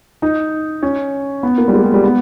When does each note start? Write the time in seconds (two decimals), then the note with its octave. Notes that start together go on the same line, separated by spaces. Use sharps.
0.22 D#4
0.83 C#4
1.43 B3
1.58 A#3
1.68 G3
1.73 G#3
1.83 G3
1.94 G3
2.04 B3